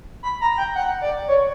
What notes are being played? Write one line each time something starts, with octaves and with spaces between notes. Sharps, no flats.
B5
A#5
G5
F#5
D5
C#5